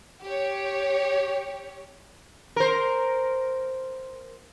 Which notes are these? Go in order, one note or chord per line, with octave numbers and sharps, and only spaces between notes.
G4 C#5
A#4 C5